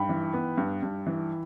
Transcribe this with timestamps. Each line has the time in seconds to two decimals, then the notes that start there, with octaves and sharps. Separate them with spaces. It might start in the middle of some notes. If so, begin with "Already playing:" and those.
Already playing: G2 G5 B5
0.09 E3
0.33 B3
0.58 G2
0.83 G2
1.07 E3